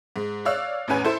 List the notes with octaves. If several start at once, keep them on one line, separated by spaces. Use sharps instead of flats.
G#2
C#5 D5 F5 E6 F#6
A1 E2 C#4 B4 G#5
E4 A4 C5